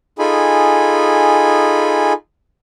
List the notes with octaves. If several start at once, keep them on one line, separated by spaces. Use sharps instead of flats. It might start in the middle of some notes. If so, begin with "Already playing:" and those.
D#4 F4 G#4 A4 G#5 B5